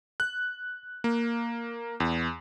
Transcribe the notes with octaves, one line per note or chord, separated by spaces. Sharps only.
F#6
A#3
E2